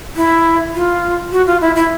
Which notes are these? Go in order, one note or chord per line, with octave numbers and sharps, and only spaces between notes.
E4
F4
F#4
F4
E4
E4